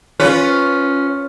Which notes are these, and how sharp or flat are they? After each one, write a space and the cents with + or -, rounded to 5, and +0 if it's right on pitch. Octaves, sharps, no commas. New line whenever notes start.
C#4 +0 F4 +0 B4 +0